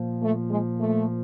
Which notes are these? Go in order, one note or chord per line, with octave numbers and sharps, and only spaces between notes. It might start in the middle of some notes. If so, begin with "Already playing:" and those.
Already playing: A#2 F3
A3
G#3
A3